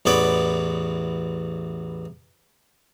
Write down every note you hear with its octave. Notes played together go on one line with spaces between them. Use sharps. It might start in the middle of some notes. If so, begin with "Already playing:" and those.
A1 E2 B3 C#5 D5 B5